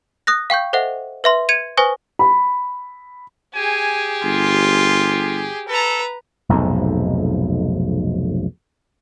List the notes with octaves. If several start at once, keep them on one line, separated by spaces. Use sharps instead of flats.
D#6 F#6 A#6
F5 G5 C#6 G6
A4 C5 D#5 E5 F#5
B4 E5 C6
G#6 C#7 D#7 F7
B4 C5 G#5 C#6 D#6 A#6
B5
G4 G#4 G#5
G1 F4
A4 B4 A#5
F1 B1 F2 G#2